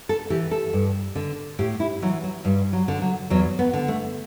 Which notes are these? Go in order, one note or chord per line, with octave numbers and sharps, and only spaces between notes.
A4
E3 G4
A4
G2
D3
A2 G4
E4
E3 F#3
F#3
G2 G3
F#3
D3
F#3
E2 F#3
B3
D3
A3